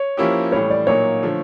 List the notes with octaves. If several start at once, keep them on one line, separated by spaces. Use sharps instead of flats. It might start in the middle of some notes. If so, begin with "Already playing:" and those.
Already playing: C#5
F3 A#3 C#4 E4 G4
A2 E3 G3 C#5
D5
A#2 F#3 A#3 D#4 C#5
D3 F3 A3